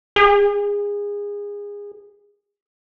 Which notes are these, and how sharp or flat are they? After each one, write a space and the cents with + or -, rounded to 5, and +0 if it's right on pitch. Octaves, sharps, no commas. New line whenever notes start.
G#4 -25